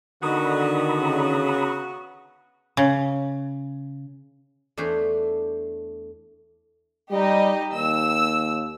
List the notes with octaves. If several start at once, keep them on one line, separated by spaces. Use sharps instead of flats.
D3 D#3 B3 F#4 A#5 B5 D#6
C#3
C#3
E2 A3 D4 C5 C#5 C6
G3 D#4 G4 D#5
D#2 E6